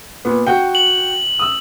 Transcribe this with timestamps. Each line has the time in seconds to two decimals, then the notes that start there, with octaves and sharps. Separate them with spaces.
0.25 A#2 B3
0.47 F#4 F#5 G5
0.75 F#7
1.39 D#6 E6